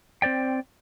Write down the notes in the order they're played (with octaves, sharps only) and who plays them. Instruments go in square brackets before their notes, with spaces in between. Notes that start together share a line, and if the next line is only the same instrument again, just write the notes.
[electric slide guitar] C4 C5 D5 G5